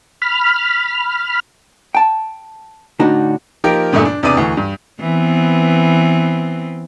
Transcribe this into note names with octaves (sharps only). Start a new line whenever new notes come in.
B5 F6
G5 A5
A2 D3 D4 D#4 F#4
F3 A#3 D#4 G4 A#4
E2 G2 A#2 D3 A3
D4
E2 C3 B3 D4 D5 D#7
D2 E3
G2
E3 B3 C4